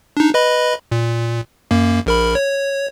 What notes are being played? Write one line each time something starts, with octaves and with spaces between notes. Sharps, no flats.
D4 D#4
B4 D#5 B5
A#2
F#2 A#3
A#1 A#4 B5
C#5